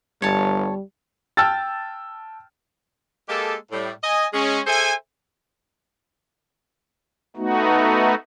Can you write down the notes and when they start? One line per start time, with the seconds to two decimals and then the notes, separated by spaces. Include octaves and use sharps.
0.22 G1 G3 C#5 A5
1.37 G5 A5 E6 F6 A6
3.29 G#3 A#3 G4 A4
3.72 A2 G3
4.03 D#5 G#5
4.33 G#3 C#4
4.66 G#4 A4 C5 E5 G#5
7.36 A3 B3 D#4 F#4